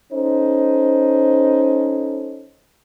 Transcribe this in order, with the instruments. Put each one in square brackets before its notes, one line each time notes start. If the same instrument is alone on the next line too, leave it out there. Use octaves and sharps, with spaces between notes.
[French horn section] C#4 D#4 A4 C5